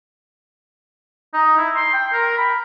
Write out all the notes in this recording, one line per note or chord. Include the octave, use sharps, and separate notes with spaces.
D#4
E4
C6
G5
A#4
B5